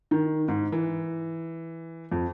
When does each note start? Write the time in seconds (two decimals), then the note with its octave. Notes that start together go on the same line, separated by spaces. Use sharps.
0.11 D#3
0.48 G#2
0.72 E3
2.12 F2